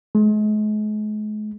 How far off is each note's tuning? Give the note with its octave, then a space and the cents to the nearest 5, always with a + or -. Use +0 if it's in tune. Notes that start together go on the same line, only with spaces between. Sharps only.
G#3 +40